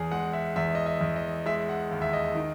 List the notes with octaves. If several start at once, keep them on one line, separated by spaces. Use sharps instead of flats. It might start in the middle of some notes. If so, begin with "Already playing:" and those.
Already playing: E2 G#4
G#3 F#5
E5
E2 E5
D#5
E5
E2
D#5
G#3 E5
F#5
D#2
E5
D#5
D#3